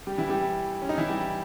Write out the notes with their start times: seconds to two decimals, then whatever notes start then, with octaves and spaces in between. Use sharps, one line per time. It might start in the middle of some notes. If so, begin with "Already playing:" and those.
0.07 G3 G4
0.18 E3 E4
0.29 G3 G4
0.82 C#4
0.89 D#4
0.98 E3 E4
1.09 G3 G4